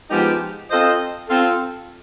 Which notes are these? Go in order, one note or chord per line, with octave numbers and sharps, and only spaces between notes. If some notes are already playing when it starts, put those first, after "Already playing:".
F3 G#3 B3 D#4 G4
C4 F4 A4 C5 D#5
C4 F4 A4